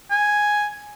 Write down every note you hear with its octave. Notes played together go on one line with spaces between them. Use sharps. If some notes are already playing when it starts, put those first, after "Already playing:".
G#5